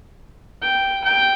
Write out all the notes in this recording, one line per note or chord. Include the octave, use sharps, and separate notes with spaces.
G5
G5